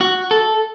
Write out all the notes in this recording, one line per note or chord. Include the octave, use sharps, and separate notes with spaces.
F#4
A4